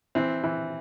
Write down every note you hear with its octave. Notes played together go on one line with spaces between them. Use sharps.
E3 C4
E3